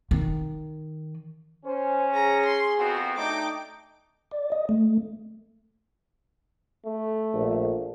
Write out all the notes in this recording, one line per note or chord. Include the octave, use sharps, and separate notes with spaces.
D#3
C#4 C5
G#4 A#5
C6
F2 B3 C4 F#4
A3 D4 D#4 G5 D6
D5
D#5
A3
A3
A#1